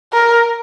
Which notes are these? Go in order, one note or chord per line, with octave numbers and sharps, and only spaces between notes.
A#4